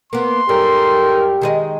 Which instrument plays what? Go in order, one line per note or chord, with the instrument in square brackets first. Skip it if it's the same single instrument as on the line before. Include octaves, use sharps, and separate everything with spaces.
[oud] A#3 B3 [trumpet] C6
[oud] F#2 G3 [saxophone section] D#4 A4 A#4 [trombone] G4
[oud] D#3 G#3 D#5